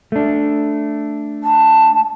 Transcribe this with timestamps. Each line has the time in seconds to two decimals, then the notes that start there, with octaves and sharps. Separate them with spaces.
0.12 A3 D4
1.43 A5